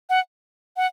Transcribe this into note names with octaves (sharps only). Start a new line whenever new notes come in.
F#5
F#5